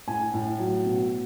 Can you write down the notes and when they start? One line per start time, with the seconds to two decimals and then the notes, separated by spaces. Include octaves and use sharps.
0.07 A2 G#5
0.34 A2
0.59 F#3
0.85 B2